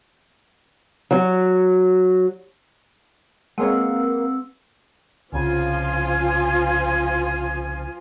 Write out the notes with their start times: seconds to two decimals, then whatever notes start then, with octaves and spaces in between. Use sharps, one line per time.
1.11 F#3
3.58 G#3 A#3 C4 B4 C#5 F5 F#5 E6
5.33 C2 C#3 F3 F4 G#5